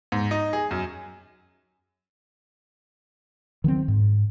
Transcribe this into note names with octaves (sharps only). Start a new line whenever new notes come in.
G#2
D#4
G#4
F#2
D#3 F#3 G3 C4
G#2